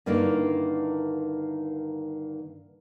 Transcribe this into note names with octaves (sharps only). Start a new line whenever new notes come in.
G2 D3 D#3 A#3 E4 D5